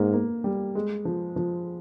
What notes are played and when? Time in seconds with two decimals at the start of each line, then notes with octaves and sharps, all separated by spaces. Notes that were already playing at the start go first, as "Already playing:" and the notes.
Already playing: G#2 A#3
0.14 A#3
0.44 G3
0.75 G#3
1.05 F3
1.36 F3